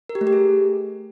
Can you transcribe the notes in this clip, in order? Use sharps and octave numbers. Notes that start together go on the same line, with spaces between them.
A#4
G4
A3
G4
G#4